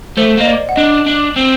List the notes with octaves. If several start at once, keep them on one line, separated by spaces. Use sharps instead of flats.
A3 C5
A#3 D#5
D5
F#5
D4 D#5
D4
C4